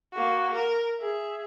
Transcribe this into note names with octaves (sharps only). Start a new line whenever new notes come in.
A#3 F#4
A#4
G#4 E5